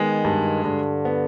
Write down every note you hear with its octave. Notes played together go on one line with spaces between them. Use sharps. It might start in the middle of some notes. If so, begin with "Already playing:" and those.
Already playing: D#3 G#3 B3
G2
G2 D3
B3